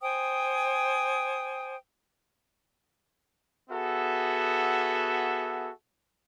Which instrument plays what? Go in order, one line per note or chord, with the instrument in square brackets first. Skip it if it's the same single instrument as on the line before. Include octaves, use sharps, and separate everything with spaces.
[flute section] C5 G5 G#5 D#6
[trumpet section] B3 F#4 G#4 A4 E5